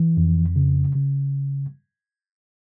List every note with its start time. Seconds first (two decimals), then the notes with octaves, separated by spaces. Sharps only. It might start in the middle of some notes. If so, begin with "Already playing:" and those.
Already playing: E3
0.17 F2
0.56 C#3
0.95 C#3